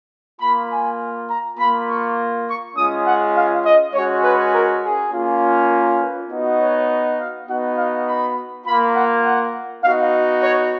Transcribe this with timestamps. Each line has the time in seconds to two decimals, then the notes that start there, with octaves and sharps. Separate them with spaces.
0.41 A#3 F4 B5
0.70 G#5
1.29 A#5
1.58 A#3 F4 B5
1.88 C#6
2.47 C#6
2.76 G#3 C#4 F4 D#6
3.05 F#5
3.35 F5
3.65 D#5
3.94 G#3 C#4 F#4 C#5
4.23 B4
4.53 A#4
4.83 G#4
5.12 A#3 C#4 F4
5.71 A#4
6.00 B4
6.30 B3 D#4 F#4
6.59 C#5
7.18 F5
7.47 B3 D#4 F#4 F#5
7.76 F5
8.06 B5
8.65 A#3 F4 B5
8.95 F#5
9.24 F#5
9.83 B3 D#4 F#4 F5
10.41 C#5